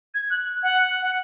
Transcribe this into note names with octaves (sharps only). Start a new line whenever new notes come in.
G#6
F#6
F#5
F#5